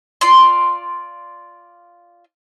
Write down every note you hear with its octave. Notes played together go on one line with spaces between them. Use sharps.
F4 D5 C6